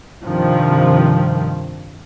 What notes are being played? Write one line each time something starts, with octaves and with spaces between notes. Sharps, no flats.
G2 C3 D#3 F3